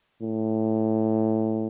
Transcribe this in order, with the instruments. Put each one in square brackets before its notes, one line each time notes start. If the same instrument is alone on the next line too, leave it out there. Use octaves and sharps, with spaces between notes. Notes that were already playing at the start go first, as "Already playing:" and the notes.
[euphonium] A2